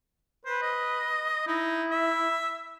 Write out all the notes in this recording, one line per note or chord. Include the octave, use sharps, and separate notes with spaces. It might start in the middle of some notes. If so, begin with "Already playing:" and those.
B4 C5
D#5
D#4 E4
E5